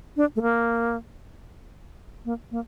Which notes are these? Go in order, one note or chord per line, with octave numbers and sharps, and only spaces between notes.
D4
A3
A#3
A#3
A#3